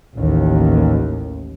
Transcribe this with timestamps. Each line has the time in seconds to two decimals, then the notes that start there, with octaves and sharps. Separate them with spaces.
0.16 A1 D#2